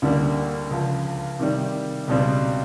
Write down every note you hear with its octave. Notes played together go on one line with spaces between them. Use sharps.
D2 D3 G3 A#3
C#2 C#3 F3
C3 D#3 G3
C#2 B2 G3 C4